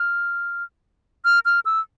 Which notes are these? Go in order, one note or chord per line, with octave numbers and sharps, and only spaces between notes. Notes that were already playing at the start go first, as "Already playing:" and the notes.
Already playing: F6
F6
F6
E6